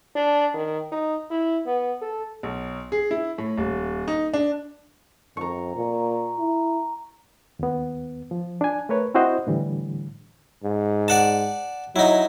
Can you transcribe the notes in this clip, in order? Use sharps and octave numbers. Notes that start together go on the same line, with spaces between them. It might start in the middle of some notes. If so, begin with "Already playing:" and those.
D4
D#3
D#4
E4
B3
A4
B1
G#4
E4
A2
D#1
D#4
D4
F2 A#5 C#6
A#2
E4
D#2 B3
F3
D4 G#5
A3 A#4 B4 C#5
C4 E4 F#4 C5 D#5
A2 D3 E3 G3
G#2
D5 F#5 A5
F#3 D#4 E4